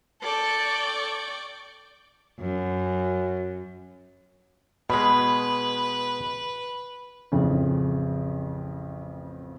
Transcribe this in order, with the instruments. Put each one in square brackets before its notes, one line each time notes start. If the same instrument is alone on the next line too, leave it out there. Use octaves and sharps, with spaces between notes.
[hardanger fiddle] A4 [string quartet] D5 G5 C#6
[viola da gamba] F#2
[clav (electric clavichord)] B2 G#3 [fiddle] B4 [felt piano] B5
[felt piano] A1 F2 C#3